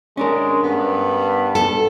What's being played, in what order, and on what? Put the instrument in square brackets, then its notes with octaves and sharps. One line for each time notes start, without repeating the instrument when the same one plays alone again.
[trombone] G#3 [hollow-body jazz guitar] C#4 D4 A#4
[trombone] G2 [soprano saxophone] B3
[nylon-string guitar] A4